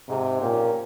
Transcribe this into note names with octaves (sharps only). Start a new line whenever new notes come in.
G#2 C3
A#2 F3 A#3 C#4 G4